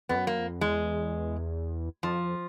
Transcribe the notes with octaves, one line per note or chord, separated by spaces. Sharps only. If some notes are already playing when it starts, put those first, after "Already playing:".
F2 B3
F#2
A#3
F2
E2 G#3
F2 F3